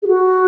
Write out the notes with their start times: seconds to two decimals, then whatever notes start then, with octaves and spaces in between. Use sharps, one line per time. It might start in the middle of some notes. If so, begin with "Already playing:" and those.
0.03 G#4
0.08 F#4